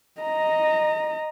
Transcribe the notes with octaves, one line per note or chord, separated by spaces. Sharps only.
D#5 A#5